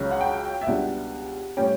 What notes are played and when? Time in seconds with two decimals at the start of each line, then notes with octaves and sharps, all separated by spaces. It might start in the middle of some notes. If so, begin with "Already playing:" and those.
Already playing: C#2 C#3 F#3 C#4
0.11 F#5
0.21 G5
0.61 E5
0.66 C#2 B2 G3 D4 F#5
1.57 A2 G3 C#4 G5